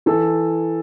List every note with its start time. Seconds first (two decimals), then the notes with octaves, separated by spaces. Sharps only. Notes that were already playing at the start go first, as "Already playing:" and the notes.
0.06 E3 A4